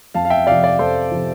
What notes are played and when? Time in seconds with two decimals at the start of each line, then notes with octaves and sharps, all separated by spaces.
0.14 F2 F5 A5
0.25 F5
0.30 E5 G5
0.47 C3 F3 D5 F5
0.62 D5 F5
0.79 F2 A4 C5
1.11 C3 F3